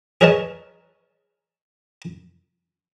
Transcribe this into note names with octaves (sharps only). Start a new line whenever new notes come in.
G#4 A#4 B4 C#5 D#5 A5